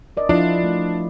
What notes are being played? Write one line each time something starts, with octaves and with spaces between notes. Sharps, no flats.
A#4 D5 D#5
F3 D4 E4 F4
A3